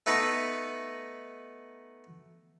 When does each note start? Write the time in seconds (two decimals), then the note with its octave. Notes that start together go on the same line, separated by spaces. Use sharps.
0.06 A3 B3 D#4 B4 D#5